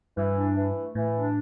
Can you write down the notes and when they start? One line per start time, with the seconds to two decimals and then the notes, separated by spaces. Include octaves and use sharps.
0.17 G2 E3
0.36 D4
0.56 E3
0.76 A3
0.95 A2 E3
1.15 D4